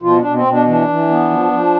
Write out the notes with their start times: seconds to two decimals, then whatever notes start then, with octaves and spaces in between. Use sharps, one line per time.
0.02 B2 F3 F4
0.18 D4
0.24 B2
0.34 C4
0.45 B2
0.50 D4
0.66 E3 D4
0.87 E3
1.09 B3
1.30 F3
1.51 F3